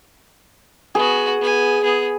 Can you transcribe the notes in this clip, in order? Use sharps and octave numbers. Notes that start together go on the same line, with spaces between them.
B3 F#4 G#4
B3 G#5
B3 G#4